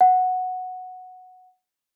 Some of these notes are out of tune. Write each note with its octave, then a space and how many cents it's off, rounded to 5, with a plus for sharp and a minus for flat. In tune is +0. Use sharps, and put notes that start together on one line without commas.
F#5 -5